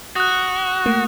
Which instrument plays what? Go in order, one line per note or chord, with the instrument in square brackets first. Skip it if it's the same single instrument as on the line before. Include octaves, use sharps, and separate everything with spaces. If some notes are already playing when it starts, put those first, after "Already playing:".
[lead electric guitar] F#4 [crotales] D#6 F#6
[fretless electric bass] A3 A#3